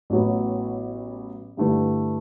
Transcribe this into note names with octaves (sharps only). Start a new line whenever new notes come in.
A1 A2 F#3 B3
G2 D3 A3 E4 B4